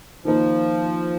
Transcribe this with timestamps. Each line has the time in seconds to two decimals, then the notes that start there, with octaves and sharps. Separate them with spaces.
0.25 D#3 F3 A#3 D#4